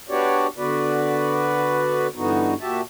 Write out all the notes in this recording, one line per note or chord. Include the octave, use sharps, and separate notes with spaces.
B3 D4 F#4 G4 C#5 D5
D3 B3 F#4 B4 D5
G2 D3 E3 B3 D#4 F#4
A#2 F#4 G4 E5 A5